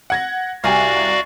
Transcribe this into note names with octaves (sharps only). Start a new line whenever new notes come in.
F#5 G#6 A#6
C2 F#4 G4 D5 F5 G#5 A#5 F6